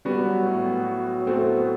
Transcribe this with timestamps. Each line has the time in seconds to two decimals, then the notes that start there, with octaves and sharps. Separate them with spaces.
0.05 G3 B3 F#4
0.26 F#3
0.46 A2
0.66 B3
0.86 F#4
1.06 F#3
1.26 A2 A3 C4
1.47 B3